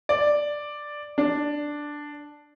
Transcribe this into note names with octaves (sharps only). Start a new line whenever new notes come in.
D5
D4